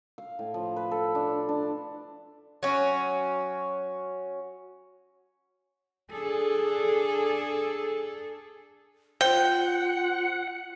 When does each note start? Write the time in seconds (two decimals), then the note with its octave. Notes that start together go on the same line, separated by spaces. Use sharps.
0.18 F5
0.39 A2
0.54 F3
0.76 B4
0.91 A4
1.15 D4
1.49 D4
2.63 F#3 C#4
6.11 D4 G#4 A4
9.21 F4 C5 F#5 G5